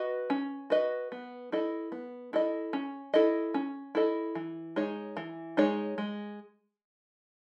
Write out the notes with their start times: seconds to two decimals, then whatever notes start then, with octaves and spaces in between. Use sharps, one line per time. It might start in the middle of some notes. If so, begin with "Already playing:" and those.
Already playing: F#4 B4 D#5
0.30 C#4
0.70 F#4 B4 D#5
1.12 B3
1.52 E4 A4 D#5
1.92 B3
2.33 E4 A4 D#5
2.73 C#4
3.14 E4 A4 D#5
3.54 C#4
3.95 E4 A4 D#5
4.35 E3
4.76 G#3 D#4 G#4 C#5
5.17 E3
5.57 G#3 D#4 G#4 C#5
5.98 G#3